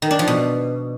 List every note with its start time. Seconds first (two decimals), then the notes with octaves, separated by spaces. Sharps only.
0.02 D#3
0.11 D4
0.19 F3
0.28 B2